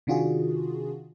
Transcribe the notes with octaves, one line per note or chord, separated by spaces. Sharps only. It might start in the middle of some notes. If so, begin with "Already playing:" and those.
C3 D#3 D4 F4 F#4 G#4